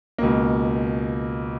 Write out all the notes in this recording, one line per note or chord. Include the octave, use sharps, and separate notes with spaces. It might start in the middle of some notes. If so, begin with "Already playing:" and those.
C#2 B2 A#3